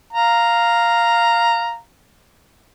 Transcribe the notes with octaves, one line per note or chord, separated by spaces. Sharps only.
F5 A#5